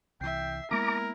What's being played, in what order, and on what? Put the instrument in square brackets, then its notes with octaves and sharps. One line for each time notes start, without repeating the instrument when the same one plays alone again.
[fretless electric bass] C2 E3 [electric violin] E5 C7 [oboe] G5
[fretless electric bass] G#3 A#3 B3 [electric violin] E4 [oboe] A#4 [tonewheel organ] A#5 D6